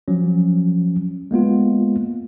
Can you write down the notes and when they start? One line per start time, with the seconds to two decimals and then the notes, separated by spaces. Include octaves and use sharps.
0.08 F3 F#3 C#4
1.31 G#3 A#3 B3 F4